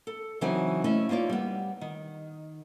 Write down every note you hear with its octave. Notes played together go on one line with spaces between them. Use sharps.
A4
C#3 E3 F#3 C4 D#4 G#5
A3 C#4 E4 D#5
A#3 D#4 F4 C#5 D5
G3 B3
D#3